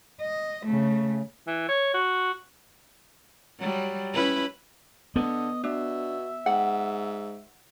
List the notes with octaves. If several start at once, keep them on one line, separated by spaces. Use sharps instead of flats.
D#5
C#3 A3
E3
C#5
F#4
F#3 G3
C#4 E4 B4
D3 B3 D#5
B2 D4 E5
G#2 F#5